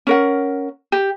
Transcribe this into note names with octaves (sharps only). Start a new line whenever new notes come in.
C#4 A#4 F#5
G4